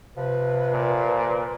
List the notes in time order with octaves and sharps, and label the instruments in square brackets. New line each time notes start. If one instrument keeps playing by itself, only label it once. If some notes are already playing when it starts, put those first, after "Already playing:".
[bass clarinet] C3 [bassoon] F3 [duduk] B4
[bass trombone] A#2